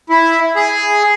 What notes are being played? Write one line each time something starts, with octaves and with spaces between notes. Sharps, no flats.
E4
G#4